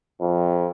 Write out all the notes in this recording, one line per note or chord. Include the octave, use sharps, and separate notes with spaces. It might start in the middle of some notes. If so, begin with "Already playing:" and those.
F2